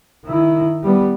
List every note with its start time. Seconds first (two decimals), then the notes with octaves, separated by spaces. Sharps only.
0.25 D#3 E4
0.83 G3 B3